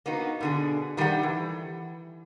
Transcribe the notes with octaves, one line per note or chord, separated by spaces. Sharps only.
A#3 B3 D#4 F#4
B2 D3 G#4
D#3 G3 A3 G#4 F#5
E3